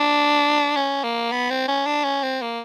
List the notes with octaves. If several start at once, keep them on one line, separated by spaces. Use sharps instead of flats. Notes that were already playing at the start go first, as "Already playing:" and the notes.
Already playing: D4
C#4
A#3
B3
C4
C#4
D4
C#4
C4
A#3